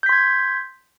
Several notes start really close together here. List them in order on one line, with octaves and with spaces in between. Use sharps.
G6 B6 C6 G#6